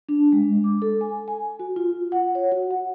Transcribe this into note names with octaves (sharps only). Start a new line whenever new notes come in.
D4
G#3
D6
A4
G#5
G#5
F#4
F4
F#5
C#5
F#4
F#5